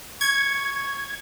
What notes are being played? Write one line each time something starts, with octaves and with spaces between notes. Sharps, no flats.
C#6 G#6